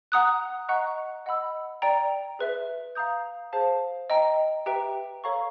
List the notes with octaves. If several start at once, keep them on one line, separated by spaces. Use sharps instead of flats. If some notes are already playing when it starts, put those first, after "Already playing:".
F#5 A#5 D#6 F#6
D#5 F#5 A#5 C#6 F#6
D#5 F#5 B5 E6
D5 G5 A#5
G#4 B4 E5
F5 A#5 D#6 G6
G#4 C5 F5 A5
D#5 G5 A#5
G4 B4 E5 G5 A#5
A4 C#5 F5 A#5 C#6